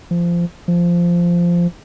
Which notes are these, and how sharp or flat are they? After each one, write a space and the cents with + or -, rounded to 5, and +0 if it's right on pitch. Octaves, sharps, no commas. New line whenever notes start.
F3 -20
F3 -10